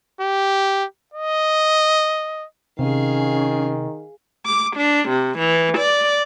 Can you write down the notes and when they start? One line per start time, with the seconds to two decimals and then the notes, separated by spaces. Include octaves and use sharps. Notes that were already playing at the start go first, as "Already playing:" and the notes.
0.21 G4
1.14 D#5
2.79 C3 D#3 C#4 G#4 F5
4.46 D6
4.76 D4
5.09 C3
5.38 E3
5.78 D5